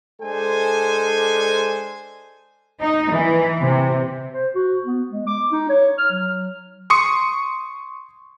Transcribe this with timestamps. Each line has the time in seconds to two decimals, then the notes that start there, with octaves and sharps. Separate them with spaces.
0.21 G#3 D4 A4 C5 G#5
2.81 D#4
3.12 E3
3.60 C3
4.34 C5
4.55 F#4
4.84 B3
5.11 G#3
5.27 D6
5.52 D#4
5.69 C#5
5.98 F6
6.11 F#3
6.90 C6 C#6 D#6 C#7